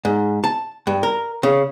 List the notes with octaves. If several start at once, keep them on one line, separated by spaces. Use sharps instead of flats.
G#2
A5
G2
A#4
C#3